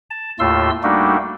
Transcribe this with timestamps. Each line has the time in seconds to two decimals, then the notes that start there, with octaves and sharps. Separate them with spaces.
0.10 A5
0.39 D#2 A2 A3 F4 C6 E6
0.83 G3 A3 A#3 D4 D#4 F#4